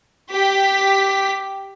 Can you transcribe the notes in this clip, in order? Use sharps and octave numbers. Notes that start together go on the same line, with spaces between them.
G4 B6